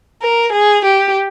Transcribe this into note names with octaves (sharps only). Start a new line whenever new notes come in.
A#4
G#4
G4